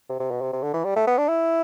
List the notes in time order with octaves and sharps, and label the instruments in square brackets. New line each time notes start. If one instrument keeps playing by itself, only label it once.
[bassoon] C3
C3
B2
C3
C3
D3
E3
G3
A3
B3
D4
E4